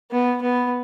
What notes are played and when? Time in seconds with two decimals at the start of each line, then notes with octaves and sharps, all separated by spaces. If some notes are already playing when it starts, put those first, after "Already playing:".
0.11 B3
0.41 B3